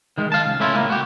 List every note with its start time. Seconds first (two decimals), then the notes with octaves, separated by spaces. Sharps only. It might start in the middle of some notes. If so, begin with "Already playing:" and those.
0.18 D#3 G#3
0.32 F5 A5
0.46 C#2
0.60 A3 C#4 E4 F4
0.75 C#2 A2 A#3
0.90 F#4 G4